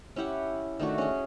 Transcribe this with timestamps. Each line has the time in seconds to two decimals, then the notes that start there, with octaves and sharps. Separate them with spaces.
0.16 C#4 E4 G4 F#5
0.80 D#3 A3 D4 F#4
0.98 C#4 G#4